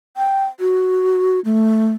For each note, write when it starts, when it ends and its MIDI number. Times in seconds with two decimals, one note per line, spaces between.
0.17 0.45 79
0.60 1.40 66
1.45 1.92 57